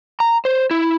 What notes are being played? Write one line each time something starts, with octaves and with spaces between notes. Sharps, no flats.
A#5
C5
E4